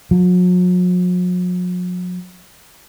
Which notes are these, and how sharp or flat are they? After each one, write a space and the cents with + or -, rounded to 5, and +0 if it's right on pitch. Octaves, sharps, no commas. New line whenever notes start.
F#3 -45